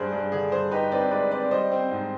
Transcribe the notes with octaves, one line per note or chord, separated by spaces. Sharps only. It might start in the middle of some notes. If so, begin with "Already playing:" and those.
Already playing: G2 G#4 C5
G2 G#4
D3 G#4
G2 G#4 C5
D#4 G4 B4
C4 B4 D5
G#3 B4 D5
C4 B4 D5
G3 C5 D#5
C4
G#2